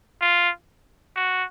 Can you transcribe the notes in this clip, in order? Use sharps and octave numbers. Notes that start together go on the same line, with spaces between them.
F4
F#4